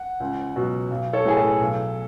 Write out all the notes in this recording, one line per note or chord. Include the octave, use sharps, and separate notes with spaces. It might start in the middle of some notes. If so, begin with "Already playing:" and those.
Already playing: F#5
C#2
B2 F#3
B1
A4 C#5
A2 E3 G#4
A4
B1